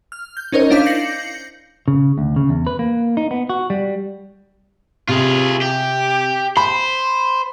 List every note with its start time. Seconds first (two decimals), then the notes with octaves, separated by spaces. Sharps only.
0.12 F6
0.37 G6
0.52 C#4 D#4 A#4 C5 C#5 D#5
0.70 D4 E4 F5 D6 G6 B6
0.86 G6 A#6 C7 C#7 F#7
1.88 C#3
2.18 D2
2.36 C#3
2.49 E2
2.67 B4
2.79 A#3
3.17 D#4
3.31 B3
3.50 F#4
3.70 G3
5.09 C3 F4 G#4
5.61 G4
6.57 C5 B5